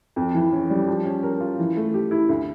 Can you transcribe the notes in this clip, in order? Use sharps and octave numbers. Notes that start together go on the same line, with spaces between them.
F2
E3
C#4
G3
F3
C#4
A#4
F4
E3
A3
G4
E4
D2